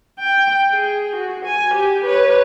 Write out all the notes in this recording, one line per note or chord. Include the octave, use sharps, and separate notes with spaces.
G5
G#4
F#4
G#5
G4
B4 C#5